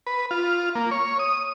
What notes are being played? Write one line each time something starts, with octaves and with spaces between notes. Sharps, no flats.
B4
F4
A#3
C#5
D#6